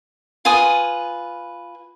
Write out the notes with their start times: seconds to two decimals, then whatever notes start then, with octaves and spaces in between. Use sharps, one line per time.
0.45 F4 B4 G#5 D#6